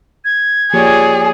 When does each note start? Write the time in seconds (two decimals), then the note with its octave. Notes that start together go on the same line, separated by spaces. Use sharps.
0.25 G#6
0.73 F3 A#3 G4 G#4 C#5 D5